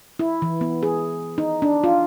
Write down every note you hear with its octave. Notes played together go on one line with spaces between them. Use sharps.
E4
E3
B3
G#4
D#4
D4
F4